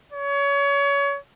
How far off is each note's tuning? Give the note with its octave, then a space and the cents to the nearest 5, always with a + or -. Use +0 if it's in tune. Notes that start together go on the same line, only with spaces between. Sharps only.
C#5 +25